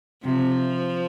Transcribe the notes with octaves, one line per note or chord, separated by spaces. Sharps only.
C3 F3